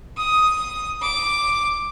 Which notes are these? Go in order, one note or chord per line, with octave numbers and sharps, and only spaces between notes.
D#6
D6